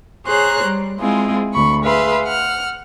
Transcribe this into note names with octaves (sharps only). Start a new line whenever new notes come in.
G#4 C5 C#5 A#5 F#6
G3
G#3 C4 E4 F4 G#4
D2 B5 C#6
G#4 B4 E5 F5 C6
F#5 F6